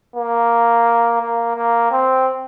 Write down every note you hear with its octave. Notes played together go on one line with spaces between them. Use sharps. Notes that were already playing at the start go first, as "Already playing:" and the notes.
A#3
A#3
A#3
C4